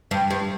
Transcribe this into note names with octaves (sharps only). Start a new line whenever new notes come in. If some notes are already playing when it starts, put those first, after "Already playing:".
G2
G2